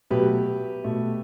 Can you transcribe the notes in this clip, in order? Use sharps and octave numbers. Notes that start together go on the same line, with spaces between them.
B2 F#3 A3 G4 B4
B2 A3